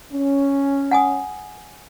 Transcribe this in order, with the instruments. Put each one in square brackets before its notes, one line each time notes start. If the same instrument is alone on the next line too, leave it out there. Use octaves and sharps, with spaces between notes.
[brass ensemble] C#4
[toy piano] F#5 G#5 D#6